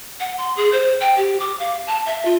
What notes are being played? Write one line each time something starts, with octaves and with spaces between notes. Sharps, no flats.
F#5
C6
G#4
C5
G5
G4
D6
F5
A5
E5
F4